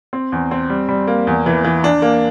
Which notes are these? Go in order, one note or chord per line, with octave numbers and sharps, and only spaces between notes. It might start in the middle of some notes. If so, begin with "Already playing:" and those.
C4
E2
C4
G3
G3
A#3
E2
E3
E3
D4
A#3